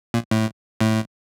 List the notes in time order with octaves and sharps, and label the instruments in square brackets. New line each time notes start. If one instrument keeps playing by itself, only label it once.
[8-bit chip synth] A#2
A2
A2